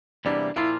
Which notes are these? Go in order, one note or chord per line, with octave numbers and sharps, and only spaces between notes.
E2 C3 G3 A#3 D4 E4
A#2 F3 A#3 E4 F4